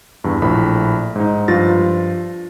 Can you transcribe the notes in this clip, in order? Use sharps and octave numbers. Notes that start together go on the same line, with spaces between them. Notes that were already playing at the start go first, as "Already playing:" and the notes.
E2 G2
A#1 A2 B5
G#2 D#4
G2 F3 F4 A6 A#6